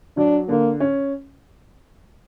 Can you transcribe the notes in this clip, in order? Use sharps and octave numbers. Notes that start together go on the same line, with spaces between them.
F#3 D4
D3 A#3
C#4